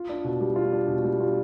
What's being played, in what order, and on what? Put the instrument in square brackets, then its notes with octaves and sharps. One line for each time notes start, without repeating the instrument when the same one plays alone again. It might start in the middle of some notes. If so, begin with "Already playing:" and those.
Already playing: [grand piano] F4
D4
B2
G3
F4
D4
B2
G3
F4